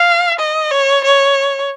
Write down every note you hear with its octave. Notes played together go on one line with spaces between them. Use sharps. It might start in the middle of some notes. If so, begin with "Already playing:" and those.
Already playing: F5
D#5
C#5
C#5